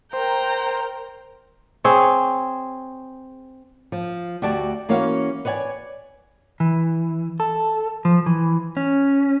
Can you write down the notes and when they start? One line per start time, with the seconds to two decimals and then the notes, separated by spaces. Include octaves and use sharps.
0.13 A#4 C5 G5 A#5
1.84 C4 G#4 C#5
3.92 F3
4.42 D2 F#4 G4 D5 A5
4.89 E3 A#3 C#4 F#4 F5
5.45 B4 C#5 D5 F#5 G#5
6.60 E3
7.40 A4
8.05 F3
8.26 E3
8.77 C#4